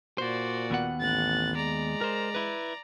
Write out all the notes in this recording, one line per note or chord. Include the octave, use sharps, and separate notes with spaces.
A#2 F#4 C5 D5
D#2 B3 F#5
A1 F#6 A6
G#3 D5 A#5
A#4 C5
E4 B4